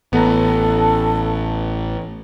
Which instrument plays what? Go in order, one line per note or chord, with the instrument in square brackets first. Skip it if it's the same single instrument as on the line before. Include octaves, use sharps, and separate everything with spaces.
[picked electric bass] A1 [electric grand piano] B3 F#5 A#5 [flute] A4